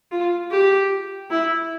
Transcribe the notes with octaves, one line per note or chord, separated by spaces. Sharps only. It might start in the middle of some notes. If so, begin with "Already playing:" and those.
F4
G4
E4